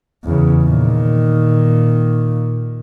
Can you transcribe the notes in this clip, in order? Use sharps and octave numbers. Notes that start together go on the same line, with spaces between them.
E2 C#3
A#2 D#3